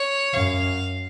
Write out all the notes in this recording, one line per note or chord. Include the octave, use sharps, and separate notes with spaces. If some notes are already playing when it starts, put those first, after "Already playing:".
Already playing: C#5
F#2 F5